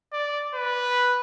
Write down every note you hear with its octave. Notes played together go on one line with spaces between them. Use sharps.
D5
B4